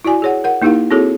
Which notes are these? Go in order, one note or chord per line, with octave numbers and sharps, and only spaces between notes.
E4 F#4 D5 G#5
G#4 C#5 F#5
A#4 F#5
A#3 D#4 E4 G4 A#4 F5
C4 E4 F#4 G#4 A4 C#5